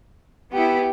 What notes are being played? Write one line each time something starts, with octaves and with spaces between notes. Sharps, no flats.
B3 E4 G4